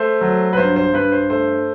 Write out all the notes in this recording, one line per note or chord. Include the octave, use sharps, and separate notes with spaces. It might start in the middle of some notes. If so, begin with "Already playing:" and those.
Already playing: A3 C5
F#3
B4
G2 C5
C5
G2 B4
C5
A3 C5